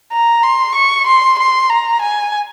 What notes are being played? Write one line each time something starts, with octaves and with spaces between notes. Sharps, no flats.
A#5
C6
C#6
C6
C6
A#5
G#5